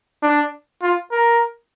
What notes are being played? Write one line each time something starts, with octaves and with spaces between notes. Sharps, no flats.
D4
F4
A#4